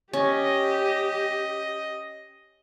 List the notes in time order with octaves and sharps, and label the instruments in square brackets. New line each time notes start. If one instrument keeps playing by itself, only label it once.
[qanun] C#4 [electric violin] G4 [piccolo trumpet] D#5